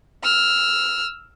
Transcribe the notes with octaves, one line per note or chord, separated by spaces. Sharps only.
E6 F6